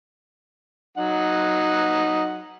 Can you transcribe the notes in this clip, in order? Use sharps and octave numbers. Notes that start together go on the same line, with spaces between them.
F#3 D#4 F#5